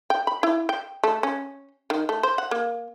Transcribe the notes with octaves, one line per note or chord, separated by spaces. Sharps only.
G5
B5
E4
G5
A3
C#4
D#3
A3
C5
F#5
A#3